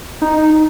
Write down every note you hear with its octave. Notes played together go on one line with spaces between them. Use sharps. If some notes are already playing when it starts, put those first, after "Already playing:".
D#4